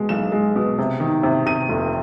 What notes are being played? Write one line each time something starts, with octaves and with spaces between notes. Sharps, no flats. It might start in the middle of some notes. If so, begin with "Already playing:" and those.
Already playing: B2 G#3
B1 E7
G#3
B2
C3
D#3
C3
C3 D#7
F1